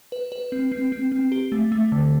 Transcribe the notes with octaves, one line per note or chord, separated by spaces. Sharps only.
B4
B4
C4
C4
C4
C4
G4
A3
A3
D3